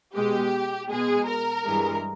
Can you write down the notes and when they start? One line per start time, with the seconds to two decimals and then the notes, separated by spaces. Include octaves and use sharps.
0.14 B2 G#3 G4
0.90 B2 G#3 G#4
1.28 A#4
1.66 G2 E3 G#3